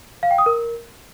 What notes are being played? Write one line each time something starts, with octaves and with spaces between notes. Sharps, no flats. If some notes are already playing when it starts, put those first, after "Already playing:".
F5
G5
D#6
A#4